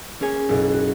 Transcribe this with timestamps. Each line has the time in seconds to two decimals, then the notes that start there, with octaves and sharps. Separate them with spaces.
0.20 A#3 C#4 G#4 C#5 G#5
0.49 F#1 B1
0.74 F#4